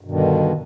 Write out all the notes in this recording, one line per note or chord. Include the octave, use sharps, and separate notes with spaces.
G2 B2 D3 D#3